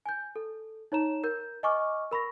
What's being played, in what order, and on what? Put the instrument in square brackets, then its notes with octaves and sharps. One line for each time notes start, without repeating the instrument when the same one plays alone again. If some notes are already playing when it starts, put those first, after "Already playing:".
[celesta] G#5 G6
A4
D#4 C#5 A#5 E7
A#4 G6
D#5 G#5 C#6 D6 F6
A#4 B5 C#6 A#6